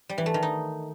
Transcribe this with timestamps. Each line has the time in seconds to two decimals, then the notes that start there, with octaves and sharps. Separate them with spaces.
0.09 G3
0.18 E3
0.26 A3
0.34 D#3
0.43 D#4